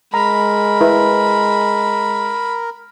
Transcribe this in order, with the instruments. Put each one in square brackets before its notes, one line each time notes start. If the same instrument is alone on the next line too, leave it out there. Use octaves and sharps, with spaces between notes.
[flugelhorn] G#3 [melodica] A#4 [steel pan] A#5 [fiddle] B5
[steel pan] E4 B4